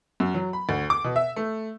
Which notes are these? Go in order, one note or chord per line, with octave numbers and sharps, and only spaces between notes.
F#2
F#3
B5
D2
D6
B2
E5
A3